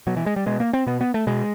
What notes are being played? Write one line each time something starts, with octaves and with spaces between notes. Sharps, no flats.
B2 F#3
E3
G#3
G3
B2 G#3
A#3
C4
B2 B3
B3
A3
B2 G#3